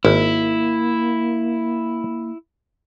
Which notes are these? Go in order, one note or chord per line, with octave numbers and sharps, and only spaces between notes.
G#1 A#3 E4